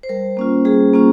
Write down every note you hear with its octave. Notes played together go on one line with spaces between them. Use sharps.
C5
G3 A#4
A#3 C#4 F4
G3 G#4
A#3 C#4 F4